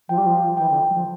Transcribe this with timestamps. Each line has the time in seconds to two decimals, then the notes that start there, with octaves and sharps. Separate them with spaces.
0.09 F3 G5
0.18 G3
0.26 F3
0.57 E3 G5
0.70 D3
0.90 G3
0.94 F3